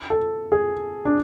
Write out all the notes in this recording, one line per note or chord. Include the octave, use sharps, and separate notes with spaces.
A4
G#4
D4